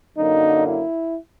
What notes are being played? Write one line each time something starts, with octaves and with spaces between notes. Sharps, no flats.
F#2 D3 F#3 A#3 D#4
E4